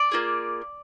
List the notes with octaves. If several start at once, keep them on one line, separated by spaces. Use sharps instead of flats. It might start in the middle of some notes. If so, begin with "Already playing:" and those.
Already playing: D5
A#3 F4 G#4